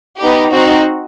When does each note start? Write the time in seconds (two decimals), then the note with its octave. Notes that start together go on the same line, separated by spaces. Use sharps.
0.18 B3 D#4 G4
0.50 C4 D#4 F#4